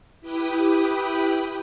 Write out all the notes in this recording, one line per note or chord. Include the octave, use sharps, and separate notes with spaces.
E4 G4 B4 G5 B5 D#6